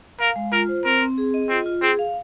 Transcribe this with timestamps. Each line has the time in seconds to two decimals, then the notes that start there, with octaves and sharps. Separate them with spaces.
0.20 A#4 F5
0.36 G#3
0.52 F4 A#4
0.68 C5
0.85 C4 A#4
1.02 C4
1.18 G#4
1.34 D#5
1.49 C4 F4
1.66 F4
1.82 C4 G#4
1.99 F5